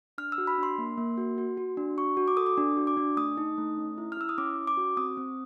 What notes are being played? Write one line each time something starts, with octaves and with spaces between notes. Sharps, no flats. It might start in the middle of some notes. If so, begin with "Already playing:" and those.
D4 F6
E6
F#4
B5
D4 C6
A#3
A#3
F#4
F#4
F#4
D4
F#4 C#6
F#4
D6
A4 D#6
D6
D4
F#4
D6
D4
A3 D#6
D#4
A3
C#4
E4
F6
E4 E6
D#6
C#4 D6
C#4
D6
F#4
C4 D#6
C4